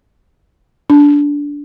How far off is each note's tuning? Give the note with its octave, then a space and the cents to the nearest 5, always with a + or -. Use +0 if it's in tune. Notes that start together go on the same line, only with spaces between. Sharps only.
D4 -15